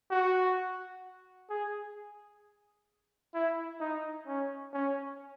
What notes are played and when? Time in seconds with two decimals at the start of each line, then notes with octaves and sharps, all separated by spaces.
0.11 F#4
1.50 G#4
3.34 E4
3.80 D#4
4.27 C#4
4.73 C#4